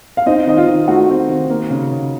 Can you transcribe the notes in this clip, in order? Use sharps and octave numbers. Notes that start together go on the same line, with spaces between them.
F5
C4 D#4 D#5
D#3 D#5
F4 F5
D#3
A3 F#4 F#5
C4
D#3
A#3
C#3
C#3